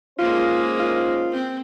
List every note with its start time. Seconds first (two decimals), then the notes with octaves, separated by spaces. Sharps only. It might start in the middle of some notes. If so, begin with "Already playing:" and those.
0.19 D#3 G#3 A#3 C#4 F4 C5
0.80 F4
1.32 C4